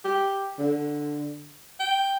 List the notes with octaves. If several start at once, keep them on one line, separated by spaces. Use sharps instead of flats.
G4
D3
G5